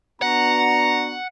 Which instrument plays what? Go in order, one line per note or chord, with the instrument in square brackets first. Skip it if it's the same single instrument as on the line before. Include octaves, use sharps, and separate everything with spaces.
[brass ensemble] B3 D4 F#4 [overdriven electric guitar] F#5 [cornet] A#5